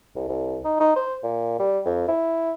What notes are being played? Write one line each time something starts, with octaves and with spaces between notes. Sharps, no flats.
C2
C2
D#4
D#4
C5
A#2
G3
F2
E4